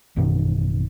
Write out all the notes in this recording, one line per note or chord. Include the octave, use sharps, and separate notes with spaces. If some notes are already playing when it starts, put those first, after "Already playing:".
A1 F#2 B2 D#3